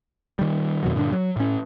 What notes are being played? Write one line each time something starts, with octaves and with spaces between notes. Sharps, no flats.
D#3 G3
F2 B2 D#3 F#3
G2 A#2 D3 D4
F#3
A2 C#4